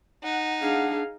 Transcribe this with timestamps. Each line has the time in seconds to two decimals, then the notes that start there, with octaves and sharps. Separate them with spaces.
0.23 D#4 F#5
0.62 D4 G#4 F5